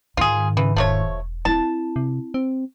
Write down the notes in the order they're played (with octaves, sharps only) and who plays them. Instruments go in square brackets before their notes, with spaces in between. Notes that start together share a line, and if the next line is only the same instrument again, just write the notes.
[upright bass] G#2 D#3 [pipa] F4 G#4
[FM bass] C#3 [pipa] E3
[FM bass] E1 [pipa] F3 A3 C#5
[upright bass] C4 E4 [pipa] A5
[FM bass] C3
C4